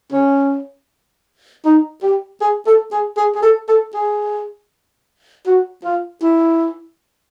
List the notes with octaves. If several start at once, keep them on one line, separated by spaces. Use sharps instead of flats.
C#4
D#4
G4
G#4
A4
G#4
G#4
G#4
A4
A4
G#4
F#4
F4
E4